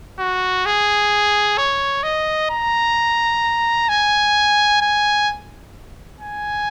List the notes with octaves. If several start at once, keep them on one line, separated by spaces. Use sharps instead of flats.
F#4
G#4
C#5
D#5
A#5
G#5
G#5
G#5